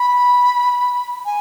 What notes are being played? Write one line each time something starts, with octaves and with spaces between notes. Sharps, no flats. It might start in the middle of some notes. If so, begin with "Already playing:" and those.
Already playing: B5
G#5